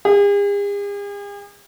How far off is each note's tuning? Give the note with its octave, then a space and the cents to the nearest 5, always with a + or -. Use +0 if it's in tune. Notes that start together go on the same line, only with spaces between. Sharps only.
G#4 -45